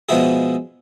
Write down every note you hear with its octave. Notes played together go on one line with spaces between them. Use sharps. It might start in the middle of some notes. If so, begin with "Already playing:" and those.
B2 F3 G#3 E4 G#4